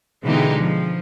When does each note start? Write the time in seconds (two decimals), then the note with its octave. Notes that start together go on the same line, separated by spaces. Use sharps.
0.24 B2 D3 E3 G#3 D#4 G4
0.58 F3